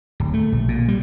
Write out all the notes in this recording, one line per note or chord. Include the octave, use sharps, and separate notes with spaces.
D1
A3
A#1
A#2
G3